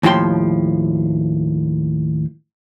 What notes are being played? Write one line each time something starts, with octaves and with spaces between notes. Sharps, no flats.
D#2 A2 F3 G5 C6